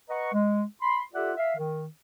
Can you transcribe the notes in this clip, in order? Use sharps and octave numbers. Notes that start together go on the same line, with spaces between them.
B4 D#5 F#5 A#5 C#6
G#3
B5 C6
F4 G4 A4 D5 E5 F#5
E5 F5
D#3